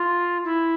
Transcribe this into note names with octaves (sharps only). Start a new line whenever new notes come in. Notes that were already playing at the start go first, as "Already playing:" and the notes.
Already playing: F4
E4